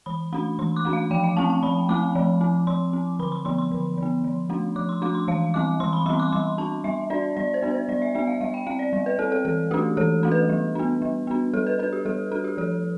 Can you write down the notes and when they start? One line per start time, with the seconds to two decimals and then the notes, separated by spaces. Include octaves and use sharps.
0.06 E3 B5
0.33 A3 D4 B5
0.59 E3 C6
0.76 D6
0.85 A3 D4
0.93 F5
1.11 F3 G5
1.24 F5
1.37 A3 C4 A5
1.50 A5
1.63 F3 B5
1.89 A3 C4 D6
2.15 F3
2.41 C4
2.67 F3 C6
2.93 C4
3.19 D3 B5
3.32 C6
3.45 F3 B3 C6
3.58 C6
3.71 D3
3.97 F3
4.02 B3
4.24 F3
4.50 A3 D4
4.76 F3 D6
4.89 C6
5.02 A3 D4 D6
5.15 C6
5.28 E3 F5
5.54 G3 C4 D6
5.80 E3 C6
5.93 B5
6.06 G3 C4 C6
6.19 D6
6.32 G3 C6
6.58 D4 A5
6.84 G3 E5
7.10 D4 D5
7.37 G3 D5
7.54 C5
7.62 B3 D4
7.71 C5
7.89 G3 D5
8.02 E5
8.15 B3 D4 E5
8.27 F5
8.41 G3 F5
8.54 G5
8.67 C4 F5
8.79 D5
8.93 G3
9.06 B4
9.19 C4 A4
9.32 A4
9.45 E3 A4
9.71 A3 D4 G4
9.97 E3 A4
10.23 A3 D4
10.32 B4
10.49 G3
10.75 B3 D4
11.02 G3
11.27 B3 D4
11.53 G3 A4
11.67 B4
11.79 D4 B4
11.93 G4
12.05 G3 A4
12.31 D4 A4
12.44 G4
12.58 F3 A4